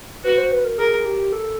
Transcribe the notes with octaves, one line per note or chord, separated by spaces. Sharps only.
F#4 B4
C5
B4
A#4
G#4 A#4
G4
A4